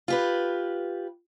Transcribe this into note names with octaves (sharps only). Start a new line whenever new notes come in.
F4 G4 B4